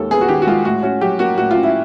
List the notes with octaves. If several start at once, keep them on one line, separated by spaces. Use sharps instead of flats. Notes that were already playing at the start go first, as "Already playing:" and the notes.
Already playing: D#2 D#3 G#3 A4
B3 G#4
F#4
D#3 G4
F#4
G#3 F4
A2 F#4
C#4 F#4
F#3 G4
A#3 F#4
A2 F#4
C#4 F4
E4